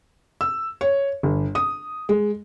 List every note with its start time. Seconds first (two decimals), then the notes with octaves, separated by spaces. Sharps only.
0.41 E6
0.81 C#5
1.23 G1
1.55 D#6
2.09 G#3